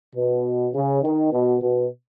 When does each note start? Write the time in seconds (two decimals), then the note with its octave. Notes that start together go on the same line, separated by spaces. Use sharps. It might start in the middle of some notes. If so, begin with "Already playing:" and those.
0.15 B2
0.74 C#3
1.03 D#3
1.32 B2
1.61 B2